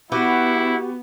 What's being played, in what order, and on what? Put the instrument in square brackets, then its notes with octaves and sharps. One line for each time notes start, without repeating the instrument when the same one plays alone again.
[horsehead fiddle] B3 [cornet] E4 [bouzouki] F#4 G4 B4 [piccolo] F#5